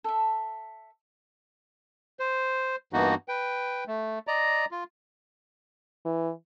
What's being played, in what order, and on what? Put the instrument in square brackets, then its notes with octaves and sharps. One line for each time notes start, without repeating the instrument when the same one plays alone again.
[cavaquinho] A4 E5
[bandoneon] C5
G2 E3 A#3 B3 D#4 F#4
B4 G5
A3
D5 D#5 A#5
F4
[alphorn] E3